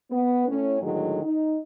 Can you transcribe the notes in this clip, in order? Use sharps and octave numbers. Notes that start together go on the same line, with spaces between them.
B3
A2 C#4
A2 D3 D#3 F#3 G#3
D#4